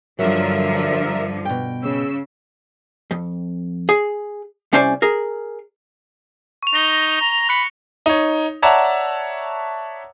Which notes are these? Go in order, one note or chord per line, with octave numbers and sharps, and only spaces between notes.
G2 D3 F3 F#3 A#4 E5
B2 G5
C#3 E6
F2
G#4
C2 C#4 C5 D5 G5 G#5
G#4 A#4
C#6 F7
D#4 A#6 G7
A#5
B5 F#6 C#7
D#4 C#5
C#5 D5 E5 F#5 A5 A#5